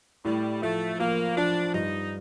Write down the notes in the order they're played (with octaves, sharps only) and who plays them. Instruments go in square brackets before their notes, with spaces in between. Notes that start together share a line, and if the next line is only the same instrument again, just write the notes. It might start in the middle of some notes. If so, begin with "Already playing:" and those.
[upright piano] A2 [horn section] G3
[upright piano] F3 [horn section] A3
[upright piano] F3 [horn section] A#3
[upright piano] F3 [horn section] D4
[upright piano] G2 [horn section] D#4